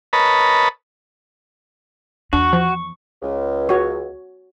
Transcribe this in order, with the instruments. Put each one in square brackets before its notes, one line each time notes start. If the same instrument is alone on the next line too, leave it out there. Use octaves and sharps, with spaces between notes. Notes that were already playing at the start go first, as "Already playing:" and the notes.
[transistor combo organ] A#4 B4 C#5 D#5 A5 B5
[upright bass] E2 [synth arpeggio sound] D4 [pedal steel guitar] F#4 [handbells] C#6
[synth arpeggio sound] F3
[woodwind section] C#2
[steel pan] F#4 C#5